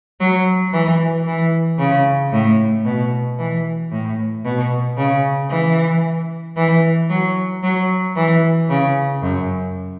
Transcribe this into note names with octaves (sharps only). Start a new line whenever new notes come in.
F#3
E3
E3
C#3
A2
B2
E3
A2
B2
C#3
E3
E3
F#3
F#3
E3
C#3
F#2